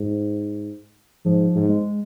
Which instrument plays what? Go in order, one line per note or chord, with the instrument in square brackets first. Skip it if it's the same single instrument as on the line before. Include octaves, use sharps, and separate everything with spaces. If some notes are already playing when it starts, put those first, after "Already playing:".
Already playing: [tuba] G#2
[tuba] G#2 [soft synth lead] F3
[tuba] G#2
[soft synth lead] G#3